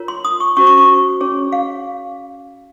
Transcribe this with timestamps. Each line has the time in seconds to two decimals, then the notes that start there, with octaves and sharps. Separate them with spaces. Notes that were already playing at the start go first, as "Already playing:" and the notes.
Already playing: F4 A#4 C#5
0.08 C6
0.25 D#6
0.40 C#6
0.57 C#4 F#4 C5 C#6
0.67 C#6
0.78 C#6
1.21 C#4 G#4 C#5
1.52 F5